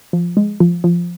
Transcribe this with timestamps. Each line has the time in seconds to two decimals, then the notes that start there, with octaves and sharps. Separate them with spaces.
0.13 F3
0.37 G#3
0.60 F3
0.84 F3